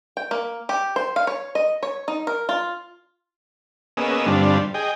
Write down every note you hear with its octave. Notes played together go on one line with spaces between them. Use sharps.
G5
A#3
G4
C5
F5
C#5
D#5
C#5
D#4
A#4
F4
A#3 B3 C#4 G#4 D#5 E6
G2 D3 G3 C4 D4 F4
G#4 D#5 G5